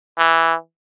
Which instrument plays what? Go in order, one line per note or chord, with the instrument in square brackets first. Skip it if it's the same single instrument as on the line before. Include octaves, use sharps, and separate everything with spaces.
[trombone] E3